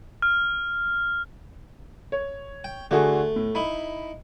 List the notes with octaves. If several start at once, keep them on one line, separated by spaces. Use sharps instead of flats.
F6
C#5
G5
D3 A3 F#4 G#4
A2
D#4 E4 B5